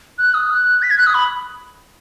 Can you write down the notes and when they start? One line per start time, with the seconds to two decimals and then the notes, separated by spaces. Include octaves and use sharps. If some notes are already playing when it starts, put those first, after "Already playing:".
0.18 F#6
0.34 D#6
0.51 F#6
0.82 B6
0.90 G#6
0.98 F#6
1.07 D#6
1.14 B5